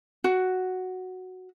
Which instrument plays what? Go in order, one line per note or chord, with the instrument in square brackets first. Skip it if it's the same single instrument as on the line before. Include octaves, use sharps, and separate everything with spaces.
[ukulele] F#4